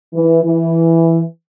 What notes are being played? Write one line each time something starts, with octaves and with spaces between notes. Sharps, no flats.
E3
E3